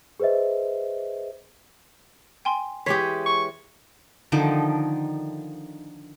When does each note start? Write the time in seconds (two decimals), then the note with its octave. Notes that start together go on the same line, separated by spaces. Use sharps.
0.20 G#4 B4 C5 D#5 E5
2.45 G5 G#5 C6
2.86 E3 G#3 G4 G#4 C#5 B6 C7
3.26 C#6
4.32 D3 D#3 F3 D#4